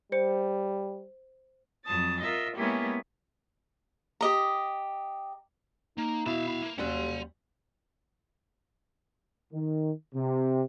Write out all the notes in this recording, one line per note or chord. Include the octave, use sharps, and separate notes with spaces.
G3 C5 C#7
F2 F#3 A5 D#6 A6
F4 A#4 D#5 E5
G#3 A#3 B3 C#4 E4 G4
G4 D#5 A#5
A#3 D#4
B2 E4 E5 F5
E4
A#3
D#2 F#3 G3 C#4 F#5 C6
D#3
C3